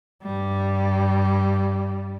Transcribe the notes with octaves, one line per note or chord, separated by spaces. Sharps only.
G2 G3